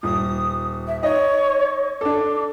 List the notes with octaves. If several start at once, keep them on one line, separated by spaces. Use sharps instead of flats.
D#1 D#6
E5
D#4 C#5 D#5
D4 A4 D6